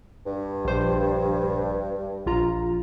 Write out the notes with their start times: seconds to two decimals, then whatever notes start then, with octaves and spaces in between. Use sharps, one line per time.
0.26 G2
0.65 A#1 C5
2.26 A#1 F4 A#5